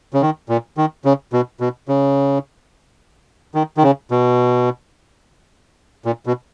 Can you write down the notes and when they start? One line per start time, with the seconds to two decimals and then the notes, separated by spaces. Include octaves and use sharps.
0.14 C#3
0.22 D#3
0.49 A#2
0.77 D#3
1.05 C#3
1.33 B2
1.60 B2
1.88 C#3
3.55 D#3
3.77 D#3
3.83 C#3
4.11 B2
6.05 A#2
6.26 B2